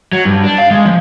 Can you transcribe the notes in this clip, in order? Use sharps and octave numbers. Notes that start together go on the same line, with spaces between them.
F#3
G2
D4
F5
G#3
F3